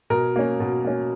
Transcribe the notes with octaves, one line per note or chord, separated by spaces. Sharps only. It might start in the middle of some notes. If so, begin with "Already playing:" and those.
B2 A#4
A#3 C#4
B2
A#3 C#4